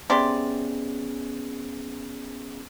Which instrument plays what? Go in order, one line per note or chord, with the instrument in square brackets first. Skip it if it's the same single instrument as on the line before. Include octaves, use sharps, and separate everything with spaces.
[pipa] C3 D5 C6 [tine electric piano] B3 C#4 G#4